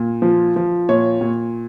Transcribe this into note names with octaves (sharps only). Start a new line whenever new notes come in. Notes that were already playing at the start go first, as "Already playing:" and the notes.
Already playing: A#2
F3
F3
A#2 C#5
A#2